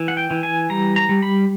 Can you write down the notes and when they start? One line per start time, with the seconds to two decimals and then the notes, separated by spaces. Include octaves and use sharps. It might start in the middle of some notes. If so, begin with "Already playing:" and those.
Already playing: E3
0.08 F#5
0.17 G5
0.31 E3
0.43 G#5
0.70 G3 A#5
0.96 A#5
1.09 G3
1.22 B5